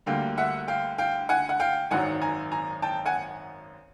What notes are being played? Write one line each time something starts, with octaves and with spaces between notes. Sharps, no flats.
D2 D3 G3 A#3 F5 G5
E5 F#5
F5 G5
F5 G5
F#5 G#5
F#5
F5 G5
G#1 F#2 D#3 F#3 F#5 G#5
G#5 A#5
G#5 A#5
G5 A5
F#5 G#5